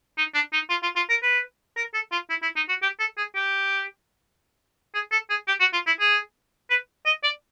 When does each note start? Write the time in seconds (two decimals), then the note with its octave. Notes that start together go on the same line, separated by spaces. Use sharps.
0.18 D#4
0.34 D4
0.53 D#4
0.70 F4
0.83 F4
0.96 F4
1.10 A#4
1.23 B4
1.77 A#4
1.94 A4
2.12 F4
2.30 E4
2.42 E4
2.56 D#4
2.69 F#4
2.82 G4
2.99 A4
3.17 G#4
3.35 G4
4.94 G#4
5.12 A4
5.30 G#4
5.48 G4
5.60 F#4
5.73 F4
5.87 E4
6.00 G#4
6.70 B4
7.06 D#5
7.23 D5